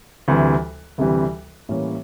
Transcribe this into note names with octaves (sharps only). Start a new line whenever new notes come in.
D2 C3 E3 G3
D2 C3 E3 G3
A2 E3 G3 A#3 C#4